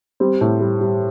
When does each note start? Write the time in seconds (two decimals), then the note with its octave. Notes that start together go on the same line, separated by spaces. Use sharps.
0.20 G3 C4
0.41 A2
0.61 G3
0.81 G3